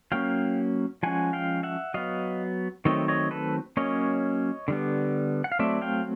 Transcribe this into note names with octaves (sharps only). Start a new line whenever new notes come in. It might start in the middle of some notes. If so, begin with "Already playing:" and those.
F#3 A#3 C#4 F5 G5
F3 G#3 C#4 F#5 G#5
F5 G5
E5 F#5
F#3 B3 D#5 F5
D#3 F#3 A3 C4 C#5 D#5
C#5 D#5
A4 B4
F#3 A#3 C#4 C#5 D#5
D3 G3 B3
F#5
F5
F#3 A3 C4 D5 E5
F5 G5